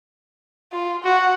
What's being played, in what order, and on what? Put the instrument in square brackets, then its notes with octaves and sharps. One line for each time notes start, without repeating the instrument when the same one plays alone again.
[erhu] F4
[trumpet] F#4 [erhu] F#5